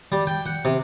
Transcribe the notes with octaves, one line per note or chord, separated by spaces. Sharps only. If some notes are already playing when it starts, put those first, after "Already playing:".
G3
G5
F#5
C3